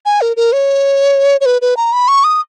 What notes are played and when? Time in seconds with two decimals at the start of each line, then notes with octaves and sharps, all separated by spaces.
0.06 G#5
0.21 A#4
0.37 A#4
0.53 C#5
1.41 C#5
1.46 B4
1.62 B4
1.77 A#5
1.93 B5
2.08 C#6
2.24 D#6